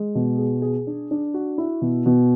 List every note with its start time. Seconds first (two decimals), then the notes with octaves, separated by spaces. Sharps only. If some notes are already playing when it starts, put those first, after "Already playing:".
Already playing: G#3
0.15 B2
0.38 G#4
0.62 G#4
0.87 D4
1.11 D4
1.34 F#4
1.58 E4
1.81 B2
2.06 B2